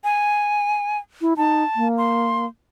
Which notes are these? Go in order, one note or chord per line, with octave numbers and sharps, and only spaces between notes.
G#5
E4
D#4 A5
A#3
C6